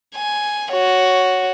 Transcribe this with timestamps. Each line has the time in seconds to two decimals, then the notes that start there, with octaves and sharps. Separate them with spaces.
0.15 G#5
0.72 F#4 C#5